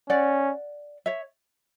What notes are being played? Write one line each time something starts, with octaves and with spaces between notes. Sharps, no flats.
C#4 D5 F#5
C#5 E5